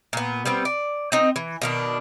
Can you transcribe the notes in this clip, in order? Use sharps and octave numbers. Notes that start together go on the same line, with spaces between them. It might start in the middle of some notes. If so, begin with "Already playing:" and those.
A#2 B3
G3 B3 C4
D5
C4 D#4 D#5
E3
B2 D#3 D4